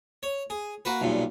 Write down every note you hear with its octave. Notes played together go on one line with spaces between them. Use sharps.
C#5
G#4
A#3 F#4 B4
B1 G2 A#2